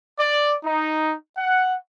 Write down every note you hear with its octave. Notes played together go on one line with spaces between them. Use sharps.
D5
D#4
F#5